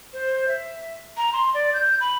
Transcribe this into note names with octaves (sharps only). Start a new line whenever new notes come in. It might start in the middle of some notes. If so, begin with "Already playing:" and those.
C5
E5
A#5
C6
D5
G6
B5